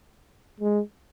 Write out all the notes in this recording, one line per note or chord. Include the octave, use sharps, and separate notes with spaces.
G#3